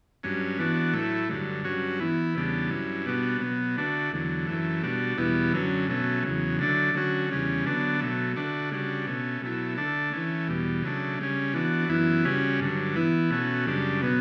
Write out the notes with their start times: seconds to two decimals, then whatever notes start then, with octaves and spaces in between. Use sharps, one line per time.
0.23 G2 F#3 C#4
0.59 E3 B3 D4 F#4
0.93 A2 F#3 A3 E4
1.29 G2 D3 F#3
1.64 G2 F#3 C#4 F#4
2.00 E3 B3 E4
2.35 E2 C#3 G3 B3 D4
2.70 G2 F#3 C#4 E4
3.06 B2 G3 B3 D4 F#4
3.41 B2 F#3 B3
3.77 D3 A3 D4 F#4
4.12 E2 D3 F#3
4.47 F#2 E3 A3
4.83 B2 G3 D4 F#4
5.18 E2 B2 G3 B3 E4
5.53 F#2 D3 F#3 C#4
5.88 B2 F#3 A3 C#4
6.23 E2 C#3 F#3
6.59 D3 F#3 A3 D4
6.94 D3 F#3 C#4 F#4
7.30 E2 C#3 G3 C#4
7.65 D3 F#3 B3 D4
8.00 B2 F#3 A3
8.36 D3 A3 D4 F#4
8.71 C#3 G3 D4 F#4
9.07 B2 A3 C#4
9.42 B2 F#3 A3 E4
9.77 D3 A3 D4
10.12 E3 A3 C#4
10.48 E2 B2 G3
10.83 C#3 F#3 A3 D4
11.19 C#3 G3 C#4
11.53 E3 B3 D4 F#4
11.89 F#2 E3 B3 E4
12.25 C#3 G3 C#4 F#4
12.60 G2 D3 F#3
12.95 E3 B3 E4
13.30 B2 A3 C#4 F#4
13.66 F#2 C#3 G3 D4
14.02 B2 F#3 B3